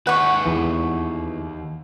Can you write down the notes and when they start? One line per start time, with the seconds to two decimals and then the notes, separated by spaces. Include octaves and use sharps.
0.07 D#2 B4 F#5 C#6
0.46 E2 E3